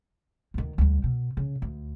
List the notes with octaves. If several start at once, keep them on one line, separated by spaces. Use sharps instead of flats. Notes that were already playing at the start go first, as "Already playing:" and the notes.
D2 D#3
D2 G3
B2
C#3
D2